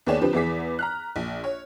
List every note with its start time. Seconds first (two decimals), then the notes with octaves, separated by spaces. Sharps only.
0.06 D#2 B3 G#4 C#5 D5 E7
0.21 D3 F3 C4 G4 B4
0.33 E2 E3 B3 G#4 D6 B6
0.79 A#5 F6 F#6
1.16 A#1
1.44 C#5